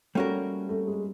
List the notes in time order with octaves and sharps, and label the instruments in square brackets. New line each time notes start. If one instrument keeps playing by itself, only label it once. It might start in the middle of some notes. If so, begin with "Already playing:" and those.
[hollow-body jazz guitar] G3 A#3 C#4 F#4 A#4 [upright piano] A3
[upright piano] A3
G#3